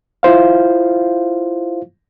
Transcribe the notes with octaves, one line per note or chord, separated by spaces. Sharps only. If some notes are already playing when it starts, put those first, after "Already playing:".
E4 F4 C5 F5